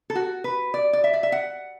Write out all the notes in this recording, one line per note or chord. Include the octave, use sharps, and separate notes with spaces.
A4
F#4
B4
D5
D5
E5
D5
E5
F#5